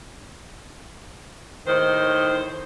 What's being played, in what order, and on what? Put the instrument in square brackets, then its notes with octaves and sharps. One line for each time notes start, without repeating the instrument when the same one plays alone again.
[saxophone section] D#2 A2 C5 [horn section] D#3